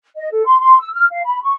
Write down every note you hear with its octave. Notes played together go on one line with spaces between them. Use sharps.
D#5
A4
C6
C6
E6
F6
F5
B5
C#6